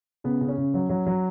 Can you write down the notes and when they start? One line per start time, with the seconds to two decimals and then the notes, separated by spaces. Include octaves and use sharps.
0.24 C#3 B3
0.41 C#3
0.49 C#4
0.58 C#3
0.74 F#3
0.89 F#3
1.07 F#3